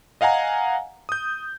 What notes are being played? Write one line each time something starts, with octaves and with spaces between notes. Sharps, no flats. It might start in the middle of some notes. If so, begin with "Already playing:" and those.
D#5 F5 F#5 G#5 A#5
D#6 G6